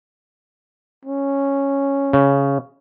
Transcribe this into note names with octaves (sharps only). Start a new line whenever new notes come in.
C#4
C#3